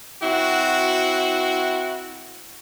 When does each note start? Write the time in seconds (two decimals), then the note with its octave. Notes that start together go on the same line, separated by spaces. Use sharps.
0.22 C4 E4 F#4